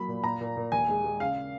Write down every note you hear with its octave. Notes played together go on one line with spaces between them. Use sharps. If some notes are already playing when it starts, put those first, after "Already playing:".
Already playing: F#3 A#3 B5
A#2
A#2 A#5
A#2
A#2
D#2 G#5
G#3
G#3
C#3 F5